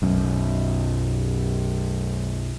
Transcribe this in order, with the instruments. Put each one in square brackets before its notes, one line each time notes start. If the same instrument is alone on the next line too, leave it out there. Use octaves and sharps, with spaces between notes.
[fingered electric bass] B1 F#2